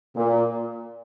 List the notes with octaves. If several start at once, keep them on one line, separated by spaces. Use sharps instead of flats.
A#2